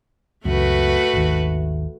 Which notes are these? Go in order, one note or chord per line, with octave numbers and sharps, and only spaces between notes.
C#2 F#2 A3 F#4 B4
G#1 D#2